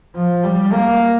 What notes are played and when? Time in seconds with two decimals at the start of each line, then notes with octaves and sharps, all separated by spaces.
0.15 F3
0.43 G3
0.72 A#3